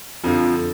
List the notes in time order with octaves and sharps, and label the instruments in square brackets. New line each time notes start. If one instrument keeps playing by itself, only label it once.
[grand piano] F2 D3 F3